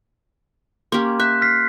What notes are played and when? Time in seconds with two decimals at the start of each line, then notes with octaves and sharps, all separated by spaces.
0.92 A#3 C#4 G4 C6
1.20 E5 F#6 G6 B6
1.41 F6 B6 C7